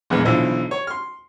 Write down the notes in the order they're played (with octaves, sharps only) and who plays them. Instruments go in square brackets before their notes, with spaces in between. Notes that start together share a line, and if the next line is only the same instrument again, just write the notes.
[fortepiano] A#1 E2 G#3 B4
B1 D3 E3 F3
C#5
C6 F6